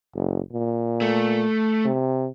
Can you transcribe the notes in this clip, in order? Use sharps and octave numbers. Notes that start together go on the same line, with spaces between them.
F#1
A#2
A3
C3